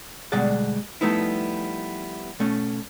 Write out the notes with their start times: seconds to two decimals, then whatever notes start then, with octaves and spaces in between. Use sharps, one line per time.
0.32 D2 B2 G3 G#3 D5 F#5
1.01 F3 G3 A3 B3 D#4 E4
2.39 B2 A3 C#4